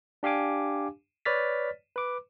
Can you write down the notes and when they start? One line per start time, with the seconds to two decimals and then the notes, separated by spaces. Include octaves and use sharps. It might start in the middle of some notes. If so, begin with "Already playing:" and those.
0.23 D4 G4 F5 G#5 D6
1.25 B4 C#5 D5 F6 A6 B6
1.96 B4 D6